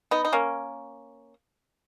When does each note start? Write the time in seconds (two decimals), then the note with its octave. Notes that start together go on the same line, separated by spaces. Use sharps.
0.11 B3 D#4
0.25 D#4
0.33 A#3 C#4